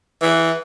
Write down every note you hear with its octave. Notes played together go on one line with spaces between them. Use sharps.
E3